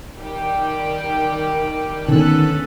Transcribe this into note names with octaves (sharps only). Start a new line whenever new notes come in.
D#3 G3 G4
D3 D#3 B3 C#4 A4 G#5 E6 F#6